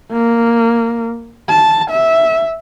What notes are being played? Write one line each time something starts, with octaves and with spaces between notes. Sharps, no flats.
A#3
A5
E5